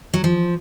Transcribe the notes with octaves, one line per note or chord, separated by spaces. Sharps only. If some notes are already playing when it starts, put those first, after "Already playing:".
F#3
F3